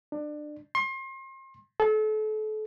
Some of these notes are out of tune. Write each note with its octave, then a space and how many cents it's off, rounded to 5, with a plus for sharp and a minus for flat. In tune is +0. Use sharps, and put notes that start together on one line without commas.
D4 +25
C6 +35
A4 -35